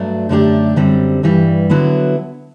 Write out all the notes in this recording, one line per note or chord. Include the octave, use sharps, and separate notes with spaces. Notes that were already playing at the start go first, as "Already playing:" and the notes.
Already playing: G2 F#3 A3 D4
F#2 D3 A3 D4 G4
F#2 D3 G3 C4
G2 E3 G3
D3 F#3 B3 E4